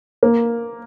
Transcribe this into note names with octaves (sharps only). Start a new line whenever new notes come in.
A#3